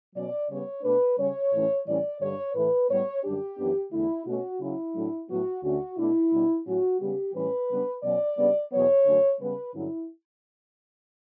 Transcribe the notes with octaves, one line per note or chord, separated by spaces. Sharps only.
B2 F#3 C#4 D5
C#3 G3 B3 C#5
B2 A3 D4 B4
C#3 G3 C#4 C#5
A2 E3 A3 C#4
A2 E3 G3 C#4 D5
G2 D3 G3 C#5
A2 E3 A3 B4
A2 G3 B3 C#5
F#2 D3 G3 D4 G4
F#2 E3 B3 D4
E2 D3 A3 E4
B2 A3 C#4 F#4
C#3 F#3 C#4 E4
A2 F#3 A3 D4
A2 F#3 B3 F#4
D2 D3 A3 C#4 F#4
B2 A3 D4 E4
B2 G3 D4
A2 F#3 C#4 F#4
C#3 G3 B3 G4
A2 E3 G3 C#4 B4
C#3 G3 B3 D4
B2 F#3 C#4 D5
C#3 G3 B3 D4
E2 B2 F#3 B3 C#5
F#2 D3 F#3 A3 C#4
C#3 G3 B3 B4
G2 D3 F#3 C#4 E4